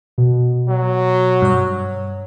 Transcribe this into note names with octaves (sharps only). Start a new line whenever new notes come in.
B2
F#3
G2 C#5